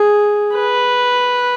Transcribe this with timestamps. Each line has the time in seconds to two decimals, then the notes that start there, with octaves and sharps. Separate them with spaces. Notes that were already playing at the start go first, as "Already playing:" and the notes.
Already playing: G#4
0.55 B4